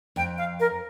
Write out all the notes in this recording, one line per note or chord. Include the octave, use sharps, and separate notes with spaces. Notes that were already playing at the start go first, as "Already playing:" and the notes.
F2 G5
F5
A#4